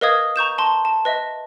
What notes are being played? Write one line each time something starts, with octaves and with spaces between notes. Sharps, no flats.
A#4 B4 D#5 F5 D#6 G#6
A#5 C#6 G6 E7
A5 C6
A5
B4 D#5 E5